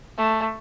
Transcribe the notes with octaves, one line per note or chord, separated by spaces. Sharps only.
A3